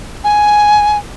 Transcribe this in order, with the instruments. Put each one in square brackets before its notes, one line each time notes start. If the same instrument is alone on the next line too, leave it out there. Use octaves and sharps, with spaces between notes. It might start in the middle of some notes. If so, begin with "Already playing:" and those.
[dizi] G#5